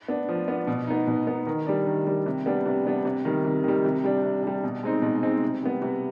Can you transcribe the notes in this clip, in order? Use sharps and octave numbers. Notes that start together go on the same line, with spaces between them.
B3 D4
F3
B3 D4
B2
B3 D#4
B2
B3 D#4
D#3
G3 D4
D#3
G3 D4
C3
G3 B3 D4
C3
G3 B3 D4
C3
D#3 G3
C3
D#3 G3
C3
G3 D4
C3
G3 D4
B2
G#3 C4 D#4
B2
G#3 C4 D#4
C3
G3 B3
C3